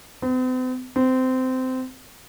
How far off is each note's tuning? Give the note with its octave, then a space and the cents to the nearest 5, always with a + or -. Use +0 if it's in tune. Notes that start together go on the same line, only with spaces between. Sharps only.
C4 -45
C4 -20